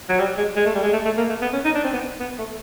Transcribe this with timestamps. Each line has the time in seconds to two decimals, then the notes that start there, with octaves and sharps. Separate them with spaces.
0.09 F#3
0.19 G3
0.38 G#3
0.56 G#3
0.66 A3
0.75 G3
0.83 G#3
0.93 A3
1.05 A3
1.17 A#3
1.29 A3
1.42 B3
1.53 C#4
1.65 D#4
1.75 D4
1.84 C4
1.93 B3
2.20 B3
2.39 A3